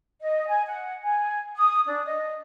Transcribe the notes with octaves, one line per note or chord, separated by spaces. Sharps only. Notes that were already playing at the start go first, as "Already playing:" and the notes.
D#5
G#5
F#5
G#5
D#6
D4
D#5